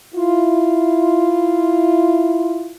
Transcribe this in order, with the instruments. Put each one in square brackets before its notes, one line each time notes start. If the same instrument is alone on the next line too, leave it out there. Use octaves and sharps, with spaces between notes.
[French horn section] E4 F4